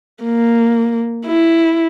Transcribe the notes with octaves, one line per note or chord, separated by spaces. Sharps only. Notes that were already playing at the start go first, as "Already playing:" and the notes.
A#3
E4